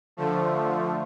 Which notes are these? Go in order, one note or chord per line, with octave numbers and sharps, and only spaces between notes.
D3 F3 A3